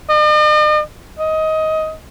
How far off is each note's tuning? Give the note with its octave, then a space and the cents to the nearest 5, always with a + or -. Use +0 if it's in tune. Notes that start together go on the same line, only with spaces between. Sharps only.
D#5 -45
D#5 +20